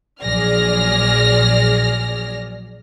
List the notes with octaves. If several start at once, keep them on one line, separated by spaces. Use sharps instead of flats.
A#1 F#3 G#4 D5 F6 A#6